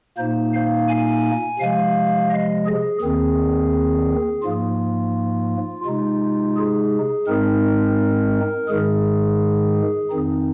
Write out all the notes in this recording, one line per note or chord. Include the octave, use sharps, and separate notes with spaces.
A#2 A#3 D#4 C5
F5
G#5
C3 F3 G#3 F5
D#5
G#4
D#2 D#3 C4 G#4
G#2 F3 A#3 F4
C3 G#3 D#4 F4
G#4
G#2 G#3 C4 D#4 A#4
G#2 D#3 G#3 G#4
F2 D#3 C4 D#4